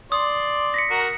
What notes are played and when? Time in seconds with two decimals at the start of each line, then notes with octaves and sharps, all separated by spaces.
0.12 D5 C6 D#6
0.74 A#6 B6 C#7
0.91 F#4 A#4